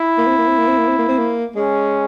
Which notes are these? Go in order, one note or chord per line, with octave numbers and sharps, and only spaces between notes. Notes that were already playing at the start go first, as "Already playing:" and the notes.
Already playing: E4
A#3
C4
A#3
C4
A#3
C4
A#3
C4
A#3
C4
A#3
G#3 C#4